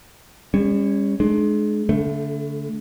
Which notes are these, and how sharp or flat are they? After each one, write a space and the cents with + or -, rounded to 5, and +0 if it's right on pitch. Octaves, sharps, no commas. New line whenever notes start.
G3 +45 C#4 +0
G#3 +30 D4 +40
D3 -35 A3 +0